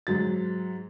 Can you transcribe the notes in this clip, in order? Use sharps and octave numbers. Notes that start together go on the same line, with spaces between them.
G#2 F#3 A6